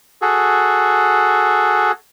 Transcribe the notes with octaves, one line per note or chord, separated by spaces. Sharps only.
F#4 G#4 A4